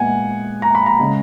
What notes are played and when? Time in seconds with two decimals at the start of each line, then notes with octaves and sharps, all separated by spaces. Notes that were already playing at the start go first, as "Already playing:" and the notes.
Already playing: A#2 G#3 B3 F#5 G#5
0.62 A#5
0.75 B5
0.86 A#5
0.99 C#3 G#3 C#4